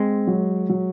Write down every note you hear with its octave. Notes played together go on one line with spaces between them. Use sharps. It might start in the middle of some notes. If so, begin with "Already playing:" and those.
Already playing: G#3 C4
F#3
F#3